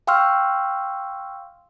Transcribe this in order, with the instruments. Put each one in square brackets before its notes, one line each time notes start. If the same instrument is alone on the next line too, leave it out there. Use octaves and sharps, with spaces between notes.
[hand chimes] F5 G5 C6 C#6 E6 F6